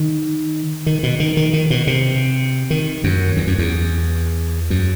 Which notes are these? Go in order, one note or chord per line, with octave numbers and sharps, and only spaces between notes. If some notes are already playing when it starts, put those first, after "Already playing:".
Already playing: D#3
D#3
B2
D#3
D#3
D#3
B2
C3
D#3
F#2
E2
F#2
E2
F#2